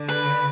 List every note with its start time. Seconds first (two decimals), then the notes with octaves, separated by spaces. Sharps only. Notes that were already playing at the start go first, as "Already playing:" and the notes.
Already playing: D3
0.08 B4